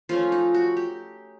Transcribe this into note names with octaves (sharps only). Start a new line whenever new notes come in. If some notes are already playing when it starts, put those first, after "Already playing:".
F3 A3 C#4 F4
D#4
F#4
G4